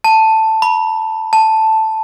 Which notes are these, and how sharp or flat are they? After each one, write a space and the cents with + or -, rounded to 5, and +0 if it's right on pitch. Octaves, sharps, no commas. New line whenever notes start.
A5 +5
B5 -30
A5 +0